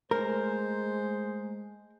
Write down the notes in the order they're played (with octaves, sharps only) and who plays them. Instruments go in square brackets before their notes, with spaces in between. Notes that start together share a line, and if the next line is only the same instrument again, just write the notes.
[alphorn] G#3 [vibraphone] A3 G#5 [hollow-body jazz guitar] A#4 [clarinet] C5